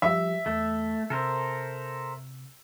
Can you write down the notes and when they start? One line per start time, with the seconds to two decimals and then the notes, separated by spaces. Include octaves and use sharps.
0.02 F3 G3 G4 E5
0.46 E2 A3
1.10 C3 A4 A#4 C5